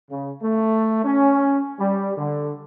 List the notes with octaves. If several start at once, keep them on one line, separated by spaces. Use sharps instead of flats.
C#3
A3
C#4
G3
D3